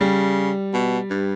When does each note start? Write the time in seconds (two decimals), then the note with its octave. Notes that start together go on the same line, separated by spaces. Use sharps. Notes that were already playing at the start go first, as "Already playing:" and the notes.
0.01 C#3 G3
0.74 B2
1.10 G2